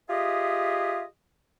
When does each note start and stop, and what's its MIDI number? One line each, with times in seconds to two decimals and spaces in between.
0.10 1.04 65
0.10 1.04 67
0.10 1.04 68
0.10 1.04 75
0.10 1.04 76